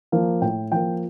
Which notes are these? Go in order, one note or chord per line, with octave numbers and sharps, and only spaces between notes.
F3 A#3
A2 G5
F3 A#3 G5